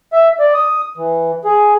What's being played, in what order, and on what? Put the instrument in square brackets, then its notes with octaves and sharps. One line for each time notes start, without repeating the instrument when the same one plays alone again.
[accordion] E5
D5
D#6
E3
G#4